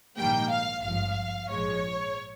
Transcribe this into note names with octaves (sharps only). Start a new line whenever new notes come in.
A#1 G#2 D#3 G3 A#3 G5
F5
G#1 G2 F3 F5
A#1 G#2 F3 G#3 C#5